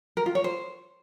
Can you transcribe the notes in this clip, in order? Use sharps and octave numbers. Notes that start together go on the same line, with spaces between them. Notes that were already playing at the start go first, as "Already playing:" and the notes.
A#4
F4
C#5
C5